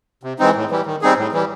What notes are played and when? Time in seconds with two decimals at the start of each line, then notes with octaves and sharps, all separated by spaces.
0.23 C3
0.39 E3 G#3 C4 D#4
0.55 A2
0.71 E3 G3
0.86 D#3
1.02 G3 C4 D#4 G#4
1.18 A2
1.32 E3 G3